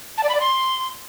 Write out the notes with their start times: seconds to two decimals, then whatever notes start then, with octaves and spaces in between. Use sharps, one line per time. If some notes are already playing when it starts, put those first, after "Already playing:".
0.18 A5
0.23 D5
0.29 B5
0.35 D5
0.40 C6